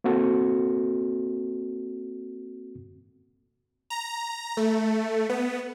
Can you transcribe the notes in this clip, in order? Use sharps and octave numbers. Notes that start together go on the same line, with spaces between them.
A#3 C4 F#4 A4
A#5
A3
B3